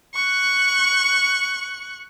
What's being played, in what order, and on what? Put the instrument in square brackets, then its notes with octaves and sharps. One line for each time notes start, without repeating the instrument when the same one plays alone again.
[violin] C#6 F#6